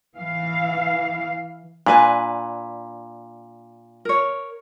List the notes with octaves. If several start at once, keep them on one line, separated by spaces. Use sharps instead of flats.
E3 F5
A#2 D4 B4 G#5
A#4 C#5